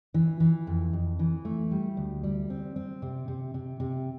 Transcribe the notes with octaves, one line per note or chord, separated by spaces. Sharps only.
E3
E3
F2
F2
E3
A3
G3
D2
G3
C4
C4
C3
C3
C3
C3